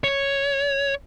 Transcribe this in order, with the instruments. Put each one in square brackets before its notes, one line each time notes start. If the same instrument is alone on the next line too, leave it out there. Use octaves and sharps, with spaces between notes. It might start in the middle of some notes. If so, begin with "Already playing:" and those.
[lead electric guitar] C#5